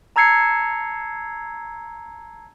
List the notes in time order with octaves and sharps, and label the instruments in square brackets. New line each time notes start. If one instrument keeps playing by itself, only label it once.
[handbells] A5 A#5 E6 G#6 C7 C#7